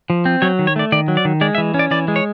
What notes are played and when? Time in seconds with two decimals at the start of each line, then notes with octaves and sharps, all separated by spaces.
0.10 F3
0.25 C4
0.42 F#3 C#5
0.59 D#3
0.67 C#5
0.76 A3 D5
0.92 D#3 D5
1.08 F#3
1.17 D5
1.25 D#3
1.41 G#3 D5
1.55 E5
1.58 E3
1.74 C#4
1.79 D5
1.91 E3 D5
2.08 G#3
2.16 C#5